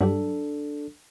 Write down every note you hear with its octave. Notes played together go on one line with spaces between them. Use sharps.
G2 F#3 D4 G4 A4